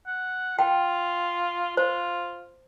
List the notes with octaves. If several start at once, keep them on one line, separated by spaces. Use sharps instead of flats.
F#5
F4 G5
F4 C5